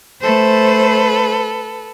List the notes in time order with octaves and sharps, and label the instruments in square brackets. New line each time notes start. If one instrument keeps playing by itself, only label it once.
[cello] A3 C5 [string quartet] A4 B4